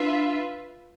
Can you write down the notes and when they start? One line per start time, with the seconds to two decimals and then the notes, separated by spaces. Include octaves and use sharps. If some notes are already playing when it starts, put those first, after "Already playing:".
Already playing: D4 F4 B4 E5